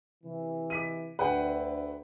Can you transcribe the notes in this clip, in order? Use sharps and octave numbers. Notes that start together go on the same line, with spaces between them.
C3 E3
D6 B6 D#7
D2 B4 F#5 G5